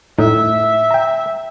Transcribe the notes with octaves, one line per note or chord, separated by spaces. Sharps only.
A2 D#4 E5
G5 A#5